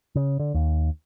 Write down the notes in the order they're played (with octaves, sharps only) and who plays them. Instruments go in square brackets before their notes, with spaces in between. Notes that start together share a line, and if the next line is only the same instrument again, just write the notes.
[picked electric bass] C#3
D3
D#2